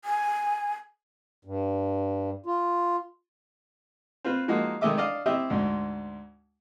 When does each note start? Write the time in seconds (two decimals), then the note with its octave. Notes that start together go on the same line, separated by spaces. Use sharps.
0.05 G#5
1.45 G2
2.46 F4
4.25 C4 F4 B4
4.48 F3 G#3 A#3 D#4 F#4
4.81 D#3 G#3 A3 D#5 E5 D6
4.97 D4 D5 D#5 F5
5.26 C4 E4 G4 D#5 E5
5.50 D2 G#2